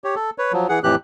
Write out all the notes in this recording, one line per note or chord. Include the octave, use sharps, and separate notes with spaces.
G4 C#5
A4
B4 C#5
F3 F#3
E3 G#4 F#5
F2 A2 E3 G4 F#6